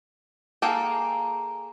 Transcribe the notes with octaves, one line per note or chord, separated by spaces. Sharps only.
A#3 G#4 A4 G5